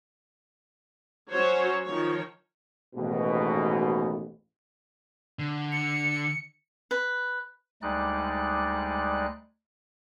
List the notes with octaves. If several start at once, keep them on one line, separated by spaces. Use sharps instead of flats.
F#3 C#4 F#4 C5 C#5
D#3 F3 C#5
A1 D#2 G#2 B2
D3
C#7
B4
D2 G3 G#3 D#4 D5 F#6